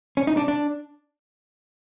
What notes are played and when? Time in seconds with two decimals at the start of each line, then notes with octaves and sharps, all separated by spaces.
0.17 C#4
0.27 D#4
0.37 D4
0.48 D4